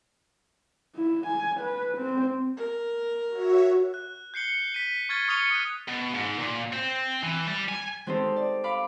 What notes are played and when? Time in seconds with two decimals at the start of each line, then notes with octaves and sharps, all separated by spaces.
0.96 E4
1.26 G#5
1.60 B4
1.98 C4
2.57 A#4
3.29 F#4 C#5 E5
3.94 F#6
4.34 G6 C7 C#7 G7
4.74 B6 D#7
5.09 C#6 F6 G#6 A6 B6 G7
5.28 C#6 D#6 F6 C#7 F7 G7
5.50 D#6 F#6
5.88 B2
6.14 G#2
6.39 A#2
6.73 C4
7.23 E3
7.47 G3
7.68 G#5
8.06 G#3 C4 D#4 G4 A4 C5
8.36 D5
8.64 F5 B5 D6